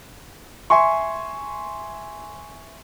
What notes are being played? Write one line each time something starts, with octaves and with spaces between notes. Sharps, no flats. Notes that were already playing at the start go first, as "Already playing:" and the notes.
E5 G#5 C6 C#6